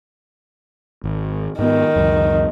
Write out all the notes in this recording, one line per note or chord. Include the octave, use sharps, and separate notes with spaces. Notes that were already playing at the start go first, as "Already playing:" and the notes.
G#1
G#2 D#3 B3
C#2 F#2